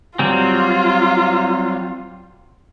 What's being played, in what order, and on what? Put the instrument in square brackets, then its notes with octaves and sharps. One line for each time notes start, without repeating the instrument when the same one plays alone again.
[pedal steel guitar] F#3 G3 C4 [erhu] F4